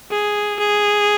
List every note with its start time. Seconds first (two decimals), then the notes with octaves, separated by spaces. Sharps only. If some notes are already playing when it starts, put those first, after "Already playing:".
0.11 G#4
0.59 G#4